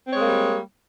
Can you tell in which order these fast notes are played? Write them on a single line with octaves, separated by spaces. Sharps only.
C4 C#5 G#3 A#3 G3